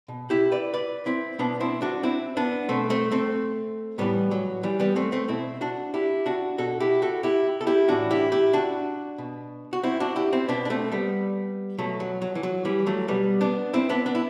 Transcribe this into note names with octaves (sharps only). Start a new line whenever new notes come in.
B2
E4 G4
B4 D5
B4 D5
C4 E4
B2 B3 D4
C4 E4
D4 F#4
C4 E4
B3 D4
B2 A3 C4
A3 C4
A3 C4
A2 E3 G3 B3
F#3
E3 G3
G3 B3
A3 C4
A3 C4
B2 C4 E4
D4 F#4
E4 G4
D4 F#4
B2 F#4 A4
E4 G4
F#4 A4
E4 G4
A4
E4 G4
A2 E3 D4 F#4
E4 G4
E4 G4
D4 F#4
B2
F#4
C4 E4
D4 F#4
E4 G4
C4 E4
B2 B3 D4
D4
A3 C4
G3 B3
B2 F#3 A3
F#3
F#3
E3
F#3
E3 G3
F#3 A3
B2 G3 B3
B3 D4
C4 E4
B3 D4
B3 D4
E4